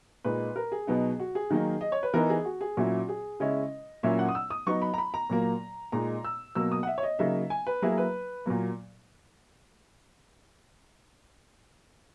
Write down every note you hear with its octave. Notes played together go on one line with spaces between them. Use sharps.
A#2 G#3 D#4 B4
A#4
G#4
B2 F#3 B3 D#4
F#4
G#4
D#3 F#3 A#3 D#4
D#5
C#5
B4
E3 B3 D#4 A#4
G#4
F#4
G#4
A#2 F#3 C#4 E4 F#4
G#4
C#3 G#3 C#4 E4 D#5
A#2 F#3 A#3 C#4 E4 E5
F#5
D#6
E6
D#6
F#3 B3 D#4 C#6
B5
A#5
B5
A#5
A#2 F#3 A#3
A#2 G#3 D#4 A#5
E6
B2 F#3 A#3 E6
D#6
F#5
E5
C#5
D#5
C#3 F#3 A#3 D#4 E5
G#5
B4
F#3 A#3 E4 G#4
B4
A#2 F#3 A#3